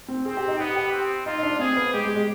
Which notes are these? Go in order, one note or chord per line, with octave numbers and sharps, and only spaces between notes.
C4
C4 G#4
G4
D#4
B3 G4
G4
C4
D#4 F4
D#4
D4
C4 G#4
B3
G#3 G4
G#3
G#3